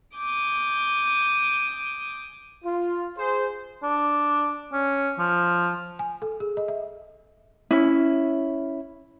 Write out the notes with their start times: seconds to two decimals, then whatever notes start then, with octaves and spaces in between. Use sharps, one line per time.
0.15 G#5 D6 D#6 G6
2.64 F4
3.18 G#4 C5
3.83 D4
4.72 C#4
5.18 F3
5.99 G#5
6.22 A4
6.40 G#4
6.57 D#5
6.68 E5
7.71 C#4 E4